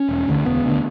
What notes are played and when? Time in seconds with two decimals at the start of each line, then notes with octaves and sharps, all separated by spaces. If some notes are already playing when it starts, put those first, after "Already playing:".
Already playing: C#4
0.09 E1
0.28 D2 D3
0.45 E1 B3
0.65 D2 D3